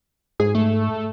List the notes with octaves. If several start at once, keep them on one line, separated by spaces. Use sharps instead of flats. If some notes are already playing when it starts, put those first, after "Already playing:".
G#2 G#4
A3